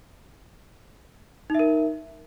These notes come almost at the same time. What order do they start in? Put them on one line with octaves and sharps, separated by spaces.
D#4 E5 A#4